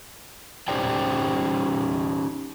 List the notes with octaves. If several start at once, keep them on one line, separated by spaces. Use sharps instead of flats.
C#4 D#4 G4 C5 D5 G5